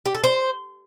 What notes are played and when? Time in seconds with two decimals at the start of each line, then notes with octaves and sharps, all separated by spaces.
0.06 G4
0.15 A4
0.24 C5